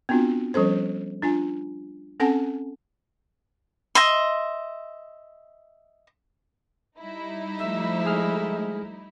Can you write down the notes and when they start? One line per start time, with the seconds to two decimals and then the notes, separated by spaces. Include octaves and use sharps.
0.09 B3 C4 D4 F4 F#4
0.54 F3 G3 C#4 A4 C5
1.22 D4 F4 G#5
2.20 C4 C#4 A4 F#5 G#5 A5
3.95 D#5 E5 C6
6.98 G3 D#4 E4
7.58 F3 A3 E5
8.05 G#3 G#4 F6